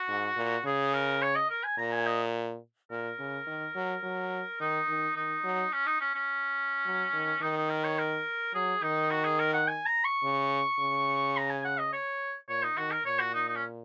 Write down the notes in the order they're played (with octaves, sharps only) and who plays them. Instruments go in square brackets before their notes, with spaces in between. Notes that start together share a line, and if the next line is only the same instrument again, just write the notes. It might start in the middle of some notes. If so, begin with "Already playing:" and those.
Already playing: [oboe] F#4
[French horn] G#2
A#2
[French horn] C#3 [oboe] G#4
[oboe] A#4
C#5
D#5
A#4
G#5
[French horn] A#2 [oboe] A#5
[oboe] G#5
D#5
[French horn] A#2 [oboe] A#4
[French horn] C#3
D#3
F#3
F#3
[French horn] D#3 [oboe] D#4
[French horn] D#3
[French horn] D#3 [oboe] D#4
[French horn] F#3
[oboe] C#4
D#4
C#4
C#4
[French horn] F#3
D#3
[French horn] D#3 [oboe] D#4
[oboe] D#4
A#4
C#5
A#4
[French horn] F#3 [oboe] G#4
[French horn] D#3 [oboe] D#4
[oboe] F#4
G#4
A#4
F#5
G#5
A#5
C#6
[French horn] C#3
C#3
[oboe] A#5
G#5
F#5
D#5
C#5
[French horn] A#2 [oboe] C#5
[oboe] D#4
[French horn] D#3 [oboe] F#4
[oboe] A#4
[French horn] A#2 [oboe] C#5
[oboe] F#4
D#4
D#4
C#4